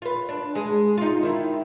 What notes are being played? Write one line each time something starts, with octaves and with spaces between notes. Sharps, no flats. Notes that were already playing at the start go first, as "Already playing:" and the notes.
F4 B4
D4
G#3 G#4
D#4 F4
D#3 E4